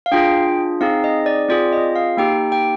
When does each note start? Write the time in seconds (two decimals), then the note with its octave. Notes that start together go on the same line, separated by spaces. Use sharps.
0.06 F5
0.12 D4 F4 G#4 G5
0.81 C4 D#4 G#4 F5
1.04 D#5
1.26 D5
1.49 C4 F4 G#4 D5
1.73 D#5
1.96 F5
2.17 A#3 D#4 G4 G5
2.52 G5